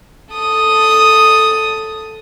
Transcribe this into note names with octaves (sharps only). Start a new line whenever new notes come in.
A4 D#6